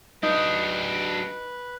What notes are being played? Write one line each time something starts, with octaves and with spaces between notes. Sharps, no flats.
F#3 D4 D#4 B4